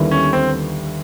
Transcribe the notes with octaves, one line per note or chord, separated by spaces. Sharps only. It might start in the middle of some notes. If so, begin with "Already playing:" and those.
Already playing: D#2 D3 G3 B3 E4
C#4
C4